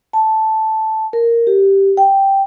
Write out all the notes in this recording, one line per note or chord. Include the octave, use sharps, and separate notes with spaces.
A5
A#4
G4
G5